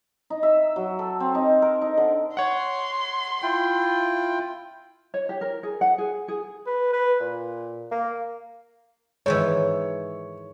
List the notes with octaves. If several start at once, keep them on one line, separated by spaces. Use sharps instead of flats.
D#4
E5
F#3
A4
C4
D#4
A#4
D#4
D3
C#5 F#5 C6
E4 F4 G5
C#5
G4
A#4
G#4
F#5
G#4
G#4
B4
B4
A#2
A#3
G#2 D#3 E3 C#5